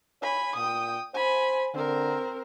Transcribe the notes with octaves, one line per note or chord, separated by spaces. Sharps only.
C#5 G#5 B5
A#2 G5 D#6
C5 G#5 B5
D3 C4 A#4